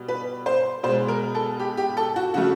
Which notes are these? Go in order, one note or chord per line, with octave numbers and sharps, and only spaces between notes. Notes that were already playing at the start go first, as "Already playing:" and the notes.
Already playing: B2 G3
B4
C5
B2 G#3 C5
A#4
A4
G4
G4
A4
F#4
C#3 F3 A3 F#4